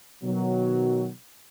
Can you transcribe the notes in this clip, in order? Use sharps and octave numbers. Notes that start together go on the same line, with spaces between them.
B2 D#3 F#3